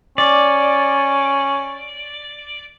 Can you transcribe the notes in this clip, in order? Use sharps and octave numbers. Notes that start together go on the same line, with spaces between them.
C#4 D5